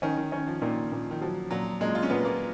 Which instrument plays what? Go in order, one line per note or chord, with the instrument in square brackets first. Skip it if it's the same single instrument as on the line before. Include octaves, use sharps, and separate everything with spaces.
[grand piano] D#3 [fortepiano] C#4
[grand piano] D#3
[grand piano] D#3 [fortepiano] C#4
[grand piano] F3
[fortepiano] A#2 [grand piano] D#3
[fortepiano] A#2
[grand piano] D#3
[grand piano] F3 [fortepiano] F#3
[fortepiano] A#2 [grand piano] F#3
[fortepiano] A#2 [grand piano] G#3
[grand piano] F4
C#4
[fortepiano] A#2 [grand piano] B3
[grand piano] A#3